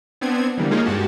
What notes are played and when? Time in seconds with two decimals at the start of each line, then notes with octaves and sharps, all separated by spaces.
0.21 B3 C4 D4 G#6
0.57 D3 E3 G3 A#3
0.71 G#3 A#3 C#4 D#4 F4 G#4
0.85 G2 G#3 F#4 G4 A5